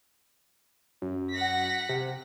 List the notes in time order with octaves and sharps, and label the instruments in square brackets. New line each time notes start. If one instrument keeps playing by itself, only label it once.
[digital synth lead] F#2
[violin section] F#5 A#6 B6
[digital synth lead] C3